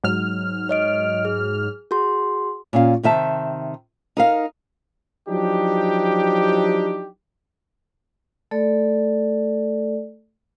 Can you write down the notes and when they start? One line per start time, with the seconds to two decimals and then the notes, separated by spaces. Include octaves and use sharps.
0.04 G#2 F#3 F6
0.69 C#5 D#5 D7
1.25 G#4
1.91 F#4 G#4 C6
2.73 A#2 C#4 F5
3.03 C3 D#3 E5 A5
4.17 D#4 A#4 F5
5.29 F3 F#3 D4 D#4 G4
8.51 A3 A4 D5